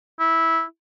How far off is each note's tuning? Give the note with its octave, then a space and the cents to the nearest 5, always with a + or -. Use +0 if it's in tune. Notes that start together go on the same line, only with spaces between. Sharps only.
E4 -10